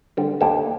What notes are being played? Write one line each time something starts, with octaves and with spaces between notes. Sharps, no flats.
D3 G3
D#2 G4 A4